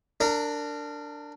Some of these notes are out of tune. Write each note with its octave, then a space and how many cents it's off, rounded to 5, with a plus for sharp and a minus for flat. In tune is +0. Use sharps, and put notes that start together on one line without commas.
D4 +0 A#4 -25